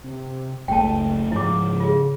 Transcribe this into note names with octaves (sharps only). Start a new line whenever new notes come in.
C3
F#1 C#2 A3 G5 A5
G#2 C#3 F3 E4 D6
F4 G#4